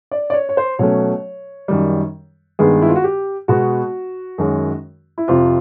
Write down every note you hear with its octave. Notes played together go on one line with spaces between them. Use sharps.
D5
D5
C#5
C#5
C5
B2 F#3 A3 C#4 C#5
F#2 D#3 G3
G2 D#3 G#3 B3 G#4
E4
F4
F#4
G4
B2 G#3 B3 F#4
F#2 D#3 G#3 C#4
E4
F2 C3 F3 F4